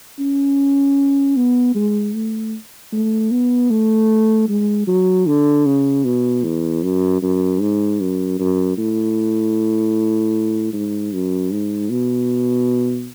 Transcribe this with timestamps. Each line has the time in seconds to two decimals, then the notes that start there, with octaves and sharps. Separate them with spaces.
0.19 C#4
1.37 B3
1.75 G#3
2.14 A3
2.93 A3
3.31 B3
3.71 A3
4.49 G#3
4.87 F#3
5.26 D3
5.66 C#3
6.05 B2
6.44 E2
6.83 F#2
7.22 F#2
7.61 G#2
8.01 F#2
8.39 F#2
8.78 A2
10.73 G#2
11.13 F#2
11.51 G#2
11.90 B2